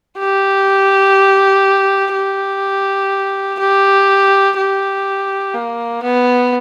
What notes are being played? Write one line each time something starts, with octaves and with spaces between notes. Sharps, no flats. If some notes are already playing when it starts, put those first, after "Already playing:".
G4
G4
G4
G4
A#3
B3